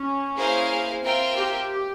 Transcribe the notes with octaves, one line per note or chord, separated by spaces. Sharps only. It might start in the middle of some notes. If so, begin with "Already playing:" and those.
Already playing: C#4
A#3 E4 G#4 C5 F5
C4 F4 A#4 E5 G5
G4